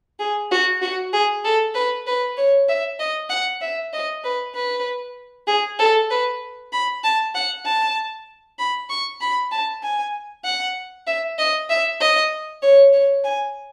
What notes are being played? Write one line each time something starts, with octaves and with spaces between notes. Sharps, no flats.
G#4
F#4
F#4
G#4
A4
B4
B4
C#5
E5
D#5
F#5
E5
D#5
B4
B4
G#4
A4
B4
B5
A5
F#5
A5
B5
C#6
B5
A5
G#5
F#5
E5
D#5
E5
D#5
C#5
C#5
G#5